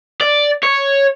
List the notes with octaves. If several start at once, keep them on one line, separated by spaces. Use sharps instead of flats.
D5
C#5